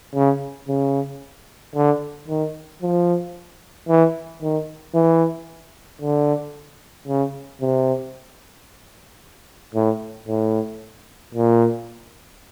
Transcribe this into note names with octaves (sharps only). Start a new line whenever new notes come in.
C#3
C#3
D3
D#3
F3
E3
D#3
E3
D3
C#3
C3
A2
A2
A#2